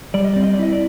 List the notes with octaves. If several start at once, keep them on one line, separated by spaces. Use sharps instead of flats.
G3 D5
D#5
C4 D5
D#5
D5
E4 D#5
D5